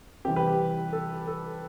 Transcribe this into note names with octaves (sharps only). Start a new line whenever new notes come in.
C3 E3 G3 C4 G4
G4 B4
G4
A4
A4